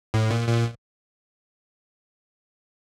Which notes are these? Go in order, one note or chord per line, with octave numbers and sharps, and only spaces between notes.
A2
A#2
A#2